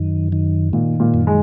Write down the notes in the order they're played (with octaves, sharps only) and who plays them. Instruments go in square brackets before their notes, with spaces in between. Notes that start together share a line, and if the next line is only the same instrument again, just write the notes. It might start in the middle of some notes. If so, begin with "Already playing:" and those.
Already playing: [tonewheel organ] F#2 D#3
D#3
[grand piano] A#2 [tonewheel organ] D#3
[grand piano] A#2
[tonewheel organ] F#2
[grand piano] G#3